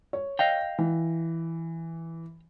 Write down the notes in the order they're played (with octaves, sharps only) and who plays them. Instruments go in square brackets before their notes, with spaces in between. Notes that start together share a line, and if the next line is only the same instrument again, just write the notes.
[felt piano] C#5
[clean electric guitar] D#5 F5 G5
[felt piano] E3